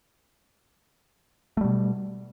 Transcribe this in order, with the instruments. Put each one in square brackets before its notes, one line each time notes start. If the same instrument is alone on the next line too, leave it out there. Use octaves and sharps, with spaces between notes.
[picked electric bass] A3
G3
B2